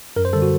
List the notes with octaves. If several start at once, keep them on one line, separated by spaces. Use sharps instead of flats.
F#2 A#4
C5
D3 G3 A4
F#4